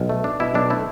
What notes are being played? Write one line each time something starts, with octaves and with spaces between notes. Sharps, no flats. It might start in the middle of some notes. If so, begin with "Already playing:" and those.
Already playing: B1
A3
D4
B2 E4
B1 D4
A3 E4